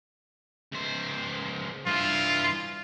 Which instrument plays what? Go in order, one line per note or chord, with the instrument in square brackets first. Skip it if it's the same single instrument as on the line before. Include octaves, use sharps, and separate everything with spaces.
[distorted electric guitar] C#2 C5
[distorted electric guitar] G2 E4 [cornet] F4